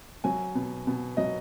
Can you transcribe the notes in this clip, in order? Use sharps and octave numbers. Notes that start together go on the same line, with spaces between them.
F#3 G#5
B2
B2
F#3 D#5